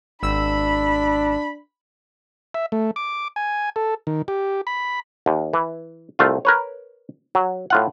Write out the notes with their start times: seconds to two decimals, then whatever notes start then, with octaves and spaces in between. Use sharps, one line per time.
0.23 G#1 D4 B5 E6
2.54 E5
2.72 A3
2.96 D6
3.36 G#5
3.76 A4
4.07 D#3
4.28 G4
4.67 B5
5.26 D#2
5.53 E3
6.19 C2 A3 F4
6.45 A#4 B4 C#5
7.35 F#3
7.70 A2 F4 F#5